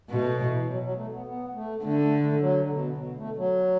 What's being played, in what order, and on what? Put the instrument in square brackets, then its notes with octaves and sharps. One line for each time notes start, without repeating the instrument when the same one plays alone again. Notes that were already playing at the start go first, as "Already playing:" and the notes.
[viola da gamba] B2 [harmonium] A3
[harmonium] F#3
E3
F#3
F#3
A3
B3
B3
A3
[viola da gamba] D3 [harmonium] A3
[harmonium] A3
A3
F#3
D3
B2
B2
A3
F#3